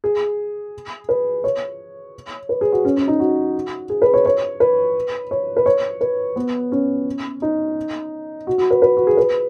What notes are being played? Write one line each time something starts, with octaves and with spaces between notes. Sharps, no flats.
G#4
B4
C#5
B4
G#4
F#4
C#4
C#4
D#4
F#4
G#4
B4
C#5
C#5
B4
C#5
B4
C#5
B4
B3
C#4
D#4
F#4
F#4
B4
B4
F#4
G#4
B4